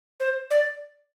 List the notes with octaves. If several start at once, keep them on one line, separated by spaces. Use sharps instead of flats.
C5
D5